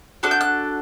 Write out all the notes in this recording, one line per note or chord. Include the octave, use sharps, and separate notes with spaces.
D4 F#4 A4 F#6
G6
F#6